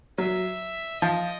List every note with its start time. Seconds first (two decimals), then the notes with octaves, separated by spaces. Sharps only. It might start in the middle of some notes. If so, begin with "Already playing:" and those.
0.18 F#3 E5
1.01 F3 D#5